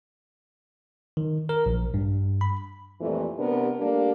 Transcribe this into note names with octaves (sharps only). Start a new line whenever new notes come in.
D#3
A#4
A#1
G2
B5
F2 A#2 E3 G3 A3
C3 B3 D4 G4 A#4
G3 A3 A#3 D4